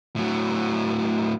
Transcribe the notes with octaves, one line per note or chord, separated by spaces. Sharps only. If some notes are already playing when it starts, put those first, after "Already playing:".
A2 F#3